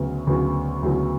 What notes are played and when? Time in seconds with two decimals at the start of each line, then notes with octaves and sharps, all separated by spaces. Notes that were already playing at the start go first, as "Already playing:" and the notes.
Already playing: D2 C#3 F#3 B3
0.27 D2 C#3 F#3 B3
0.83 D2 C#3 F#3 B3